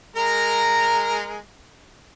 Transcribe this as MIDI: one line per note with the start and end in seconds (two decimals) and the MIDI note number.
0.16 1.37 56
0.16 1.37 70
0.16 1.37 82